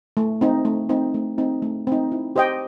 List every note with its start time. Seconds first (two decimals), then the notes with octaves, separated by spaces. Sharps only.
0.17 A3
0.41 C4 D#4
0.65 A3
0.89 C4 D#4
1.14 A3
1.38 C4 D#4
1.62 A3
1.87 C4 D#4
2.12 E4
2.36 G4 C5 D#5 G5